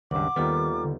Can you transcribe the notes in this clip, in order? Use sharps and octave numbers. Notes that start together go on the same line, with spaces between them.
C#2 G2 D#3 F#5 D6
D#2 D#3 G3 B3 F4 A4 A#5
D3